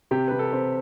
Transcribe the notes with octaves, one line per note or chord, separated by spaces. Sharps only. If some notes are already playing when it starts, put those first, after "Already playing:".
C3 G4
C3 B4
A4
C4